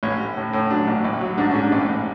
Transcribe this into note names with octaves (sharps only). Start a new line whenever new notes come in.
A1 C#5
A1
A2
A2
F#3 D4
A1
A1
F#3
G#2 D4
G#2 C#4
D4
A1
A1